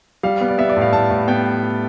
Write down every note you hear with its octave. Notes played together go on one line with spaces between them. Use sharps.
G3 F5
B3
D5
B3 E5
D5
A2 F5
A2 A5
A2
B3 G5